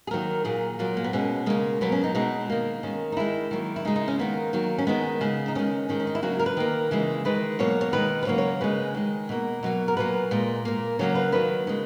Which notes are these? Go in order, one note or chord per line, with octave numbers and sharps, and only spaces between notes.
G#4
D#3 F#3 A#3 A#4
A#2 F#3 A#3 G#4
A#2 F#3 A#3
A#3
B3
B2 G#3 C#4
C#3 G#3 A#3
B2 F#3 A#3 B3
C#4
D#4
B2 G#3 D#4
D#3 A#3
D#3 G#3 C#4
D#4
D#3 G#3 E4
D#3 F#3 A#3
E4
C#3 G#3 D#4
D#4
C#4
D#3 A#3 B3
D#3 F#3 A#3
C#4
D#3 G#3 B3
C#3 G#3
D#4
D#3 G#3 C#4
D#3 G#3 C#4
C#4
D#4
E4
C#3 F#3 A#3 F#4
A#4
B4
D#3 A#3
C#3 E3 G#3
D#3 G#3 B4
B2 F#3 A#3 C#5
C#5
D#3 G#3 B4
B4
C#3 F#3 A#3 C#5
C#5
C#3 G#3 B4
D#3 G#3
B2 A#3
B2 F#3 A#3
A#4
A#2 F#3 A#3 B4
A#2 G#3
A#2 A#3
C#3 F#3 A#3 C#5
B4
D#3 F#3 A#3 B4
C#3 G#3